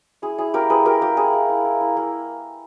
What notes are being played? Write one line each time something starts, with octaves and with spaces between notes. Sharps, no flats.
E4 G#4
E4 G#4
A#3 G4 A#4
E4 G#4 B4
A#3 G4 A#4
A#3 G4
E4 G#4
A#3
E4
E4
E4
A#3